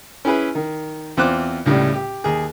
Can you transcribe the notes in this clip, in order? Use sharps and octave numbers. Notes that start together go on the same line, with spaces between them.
C#4 E4 G#4 B4
D#3
E2 C4 F4 C5 D6 F#6
C#2 A2 C#3 G3
G4
D#2 G#4